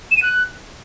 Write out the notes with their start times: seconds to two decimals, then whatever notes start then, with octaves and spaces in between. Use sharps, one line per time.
0.11 E7
0.17 D#7
0.22 F#6